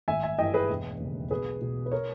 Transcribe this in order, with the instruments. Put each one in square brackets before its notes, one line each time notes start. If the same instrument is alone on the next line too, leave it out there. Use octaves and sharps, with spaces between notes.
[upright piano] G#1 E5 G#5
E5 G#5
G2 E3 D#5 G5
G#4 B4
E1
D#2 C#3
B1 G#4 B4
B2
B4
A#4 C#5